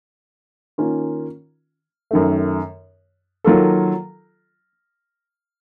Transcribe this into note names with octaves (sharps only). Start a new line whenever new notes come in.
D#3 A#3 C#4 F4
F#2 D#3 A3
D#3 F#3 A#3 F4 A4